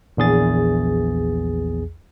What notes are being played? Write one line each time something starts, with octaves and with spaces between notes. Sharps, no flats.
A#1 E2 G#4 A6